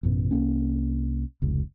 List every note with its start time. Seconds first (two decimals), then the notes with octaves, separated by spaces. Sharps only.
0.03 A1 F#2 B2
0.31 C2 A#3 C#4
1.42 F1 C#2